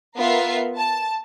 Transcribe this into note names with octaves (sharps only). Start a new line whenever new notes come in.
B3 F4 A#4 E5 C7
A5